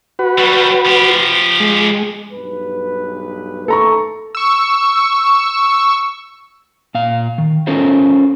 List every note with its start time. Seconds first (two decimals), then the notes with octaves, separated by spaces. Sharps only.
0.19 F#4 B4
0.38 F#3 G3
0.85 F3 G4
1.60 G#3
2.33 B1 G2 B4
3.68 D#3 A3 A4 A#5 C#6
4.35 C#6 E6
6.95 A#2 F5
7.38 D#3
7.67 C#4 F4 A4 A#4 C5